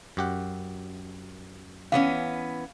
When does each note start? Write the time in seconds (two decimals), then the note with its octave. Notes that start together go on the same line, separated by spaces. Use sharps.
0.17 F#2 G4 F#5
1.92 E3 B3 C#4 F5